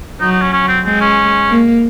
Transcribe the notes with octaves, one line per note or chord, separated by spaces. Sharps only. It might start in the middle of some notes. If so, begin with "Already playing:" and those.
F#3 D#4
D#4
C#4
C#4
C4
G#3 C4
C#4
A#3